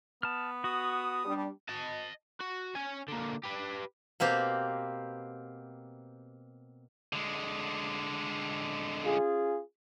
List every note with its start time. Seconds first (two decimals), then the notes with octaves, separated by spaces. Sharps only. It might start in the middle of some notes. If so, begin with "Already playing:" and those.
0.23 B3 A5 F6
0.64 F#4 D#6
1.25 G3 D4
1.69 D#5 A5
2.40 F#4
2.75 C#4 G#5
3.08 D3 A#3
3.43 G4 B4
4.20 B2 A#3 C4 G4
7.13 D3 G#3
9.06 C#4 F4 G#4